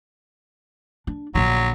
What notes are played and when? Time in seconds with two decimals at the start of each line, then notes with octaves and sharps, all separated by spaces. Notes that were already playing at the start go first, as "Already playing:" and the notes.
1.07 D4
1.35 A#1 D3 F#3